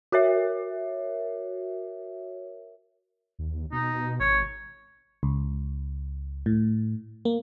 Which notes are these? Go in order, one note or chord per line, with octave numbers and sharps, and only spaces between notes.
F#4 A#4 C#5 E5
D#2
B2 D#4
G#1 C#5
C#2
A2
A#3